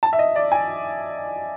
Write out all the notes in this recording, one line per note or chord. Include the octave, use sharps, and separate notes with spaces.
A5
E5
D#5
D5
G#5